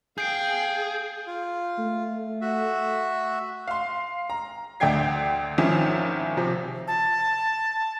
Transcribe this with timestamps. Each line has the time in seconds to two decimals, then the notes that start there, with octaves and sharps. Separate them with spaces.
0.18 G#4 F5 G5 G6 C7 D7
1.27 F4
1.79 A3
2.41 F#4 E5
3.68 F5 C6
4.30 A#5
4.80 D2 A3 D4 G5 G#6 C7
5.58 G#1 D#3 F3 C#4 E4
6.37 C3 F3
6.88 A5